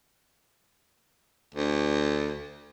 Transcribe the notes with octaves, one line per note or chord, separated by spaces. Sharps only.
D2